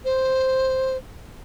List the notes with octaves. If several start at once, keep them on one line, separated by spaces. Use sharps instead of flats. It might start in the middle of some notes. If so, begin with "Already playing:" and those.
C5